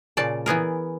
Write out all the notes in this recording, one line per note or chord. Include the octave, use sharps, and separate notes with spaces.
A#2 C#3 D5 A5
E3 B3 G#4 A#4